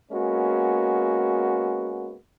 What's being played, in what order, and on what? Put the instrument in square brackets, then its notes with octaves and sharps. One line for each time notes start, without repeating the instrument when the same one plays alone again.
[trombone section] G#3 A#3 B3 C#4 F#4